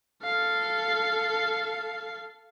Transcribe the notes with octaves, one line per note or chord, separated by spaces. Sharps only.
A4 F5